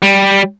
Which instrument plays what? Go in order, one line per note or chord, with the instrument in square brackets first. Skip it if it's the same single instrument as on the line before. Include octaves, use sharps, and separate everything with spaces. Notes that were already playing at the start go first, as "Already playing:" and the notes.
[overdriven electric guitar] G3